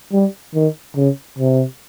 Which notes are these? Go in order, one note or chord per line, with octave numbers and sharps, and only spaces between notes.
G3
D#3
C#3
C3